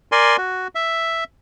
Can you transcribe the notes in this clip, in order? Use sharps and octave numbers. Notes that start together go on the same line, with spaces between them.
A#4 D5 G#5 C6
F#4
E5